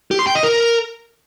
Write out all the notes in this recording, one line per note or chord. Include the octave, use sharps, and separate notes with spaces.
G4
C6
G5
D#5
A#4